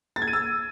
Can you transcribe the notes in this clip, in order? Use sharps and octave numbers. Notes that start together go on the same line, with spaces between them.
A6
G#6
D#7
E6